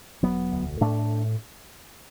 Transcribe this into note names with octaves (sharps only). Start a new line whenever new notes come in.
E1 F#3 B3
D2
A2 A3 D4